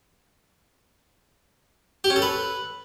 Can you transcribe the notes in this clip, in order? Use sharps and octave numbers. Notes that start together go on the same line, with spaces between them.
G4
C#4
A4
B4